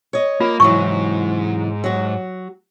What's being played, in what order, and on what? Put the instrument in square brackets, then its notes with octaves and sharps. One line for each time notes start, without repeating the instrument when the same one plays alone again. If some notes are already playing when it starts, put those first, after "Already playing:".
[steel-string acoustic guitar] C#5 D#5
[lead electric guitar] A#3 [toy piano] F4
[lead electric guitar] G#2 [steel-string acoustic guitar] C3 E3 F#3 [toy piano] C#6
[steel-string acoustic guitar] F#3 F#4